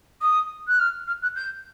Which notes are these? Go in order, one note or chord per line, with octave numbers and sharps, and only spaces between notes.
D#6
F#6
F6
F6
F#6
G6